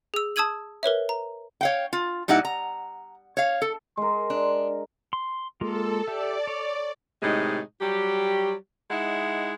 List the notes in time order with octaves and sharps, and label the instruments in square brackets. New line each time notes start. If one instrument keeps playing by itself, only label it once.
[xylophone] G#4 E6
A5 D#6 E6 G#6 D#7 F#7
A#4 B4 C#5 E5
A#5
[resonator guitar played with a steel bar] C#5 F5 G5
F4
A#2 G3 D#4 E4 F#5
A#5
C#5 F5
A4
[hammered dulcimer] G#3 A#4 [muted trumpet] C6
[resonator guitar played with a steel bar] D4
[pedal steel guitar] C6
[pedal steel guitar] G#3 A#3 F4 [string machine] A4
[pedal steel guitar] G4 E5 [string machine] D5
[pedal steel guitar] C#5
[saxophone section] A2 C3 D#3 G#3 D#4
F#3 G3 F#4 G4
G#3 D#4 E4 E5 F#5